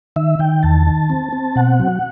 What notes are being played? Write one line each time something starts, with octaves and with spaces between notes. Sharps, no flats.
D#3 E5
D#3 G5
E2 A5
D#3
C4
C4
B2 F#5
F#3